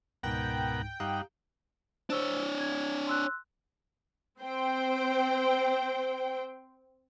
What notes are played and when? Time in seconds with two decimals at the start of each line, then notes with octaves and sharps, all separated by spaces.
0.23 C#2 G#2 B2 A#4 F#5 G5
1.00 G2 D#4 G4 F5 F#5 A#5
2.10 D4 C5 C#5 E6 G7
2.60 G#6
3.07 C6 E6 F#6
4.40 C4 C5 G5